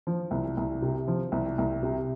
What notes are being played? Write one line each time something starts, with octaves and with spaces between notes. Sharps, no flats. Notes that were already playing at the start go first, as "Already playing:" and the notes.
F3
C2
C2
C3
F3
C2
C2
C3